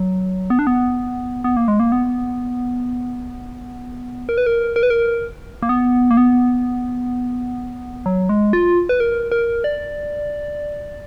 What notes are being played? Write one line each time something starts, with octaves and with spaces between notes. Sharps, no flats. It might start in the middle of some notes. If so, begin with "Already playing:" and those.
Already playing: F#3
B3
D4
B3
B3
A#3
G#3
A#3
B3
A#4
B4
A#4
A#4
B4
A#4
A#3
B3
A#3
B3
F#3
G#3
F4
B4
A#4
A#4
D5